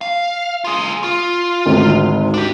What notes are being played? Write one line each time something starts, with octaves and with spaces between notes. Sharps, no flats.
F5
F4 G#4
F4
G#1 D2
D4 G4